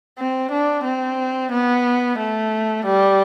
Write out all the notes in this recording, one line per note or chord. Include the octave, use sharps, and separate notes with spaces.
C4
D4
C4
B3
A3
G3